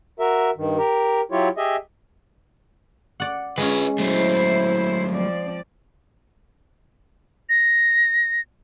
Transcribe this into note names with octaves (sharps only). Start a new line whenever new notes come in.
F#4 A#4 E5
G2 D#3
G4 A#4
F#3 E4 F4 G4 C#5
G4 G#4 D#5 E5
D5 F#5
G#3 C#4 F4 B4
F#3 A3 E4 C5
F3 C4 D5
A#6